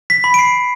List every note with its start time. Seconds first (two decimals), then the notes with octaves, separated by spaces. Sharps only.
0.10 B6
0.24 B5
0.34 D7
0.39 C7